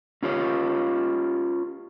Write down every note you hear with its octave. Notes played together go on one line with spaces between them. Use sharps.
C#4 F4 G4 C#5